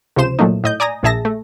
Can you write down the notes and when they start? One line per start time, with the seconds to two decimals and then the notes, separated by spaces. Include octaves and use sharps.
0.16 C#2 C3 F3 C5 E7
0.39 A#2 F#3 A3 A#3 D#4
0.64 A2 D#5 G6
0.80 D5 G#5 A#5 D#6 A#6
1.03 A#1 A#2 G#4 E5 A5 A#6
1.25 A3